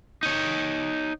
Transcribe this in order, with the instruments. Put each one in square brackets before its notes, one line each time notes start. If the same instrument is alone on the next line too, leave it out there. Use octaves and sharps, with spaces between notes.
[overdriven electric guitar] D#4 C#5